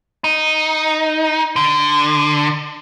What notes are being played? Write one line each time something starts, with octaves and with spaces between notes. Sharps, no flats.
D#4
D3